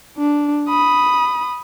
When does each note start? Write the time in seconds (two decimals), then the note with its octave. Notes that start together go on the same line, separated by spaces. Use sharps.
0.18 D4
0.69 B5 D#6